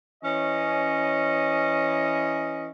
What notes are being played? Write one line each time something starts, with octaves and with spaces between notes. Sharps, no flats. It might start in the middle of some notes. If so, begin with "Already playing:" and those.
E3 C#4 D#5